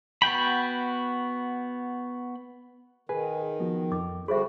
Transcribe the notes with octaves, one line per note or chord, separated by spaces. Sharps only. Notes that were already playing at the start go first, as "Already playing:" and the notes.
B3 F#4 G5 B5
D#3 G#4 B4 G#5
F3 B3 F#4
F2 D6
D3 G3 F#4 G#4 C5 E5 B5